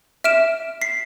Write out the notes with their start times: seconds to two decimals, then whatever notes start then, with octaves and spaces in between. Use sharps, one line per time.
0.24 E5 F6 D7 E7
0.81 B6 C7